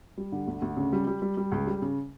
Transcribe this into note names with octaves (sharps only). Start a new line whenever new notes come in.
G3
D3
D2
D2
C#3
G3
G3
G3
G3
C#2
G3
C#3